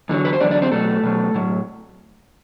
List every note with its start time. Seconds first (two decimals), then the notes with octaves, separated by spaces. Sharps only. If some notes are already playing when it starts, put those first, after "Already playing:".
0.09 E2 D3 F#3
0.25 B4
0.33 C5
0.41 E2 D3 F#3 D4 D5
0.51 D4 D5
0.62 C4 C5
0.72 B2 F#3 A3 A4
1.03 B2 F#3
1.35 A2 F#3